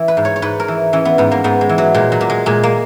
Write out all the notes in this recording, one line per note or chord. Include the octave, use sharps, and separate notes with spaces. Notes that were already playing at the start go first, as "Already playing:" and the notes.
Already playing: E3
B4
G#2
C#5
C#5
G#2 B4
A#4
E3
E3 C#4
B3
G#2 B3
A#3
G#2 B3
G#3
E3
F#3
A#2 G#3
F#3
A#2
G#3
A#2 G#3
A#3